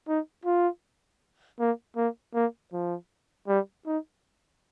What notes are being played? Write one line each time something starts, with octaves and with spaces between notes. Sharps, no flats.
D#4
F4
A#3
A#3
A#3
F3
G3
D#4